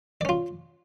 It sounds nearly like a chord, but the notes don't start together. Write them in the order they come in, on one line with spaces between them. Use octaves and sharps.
D5 C#4 F4